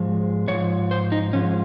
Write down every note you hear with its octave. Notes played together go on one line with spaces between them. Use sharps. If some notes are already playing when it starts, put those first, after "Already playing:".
Already playing: G#2 F3 G#3
G#2 F3 C#5
C5
D#4
G#2 F3 G#3 C#4